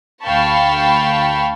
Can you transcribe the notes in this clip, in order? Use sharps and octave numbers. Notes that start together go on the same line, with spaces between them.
D2 F5 G5 A5 B5 C#6